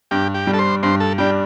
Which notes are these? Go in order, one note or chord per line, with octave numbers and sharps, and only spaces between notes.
G2 G4
G4
G3 D4
A4
C5
G2 C5
A4
G3 D4 G4